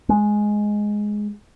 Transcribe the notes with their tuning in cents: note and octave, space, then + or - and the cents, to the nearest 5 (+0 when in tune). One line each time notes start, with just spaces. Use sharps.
G#3 +5